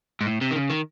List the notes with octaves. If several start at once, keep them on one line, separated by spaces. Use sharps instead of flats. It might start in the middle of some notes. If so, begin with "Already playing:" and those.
G#2
A2
C3
D#3
C#3
D#3